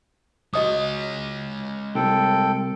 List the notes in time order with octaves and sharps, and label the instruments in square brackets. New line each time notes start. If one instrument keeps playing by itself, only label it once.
[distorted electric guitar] G#3 C#5 [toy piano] F#4 D#5 D#6
[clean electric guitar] C2 [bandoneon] A4 G5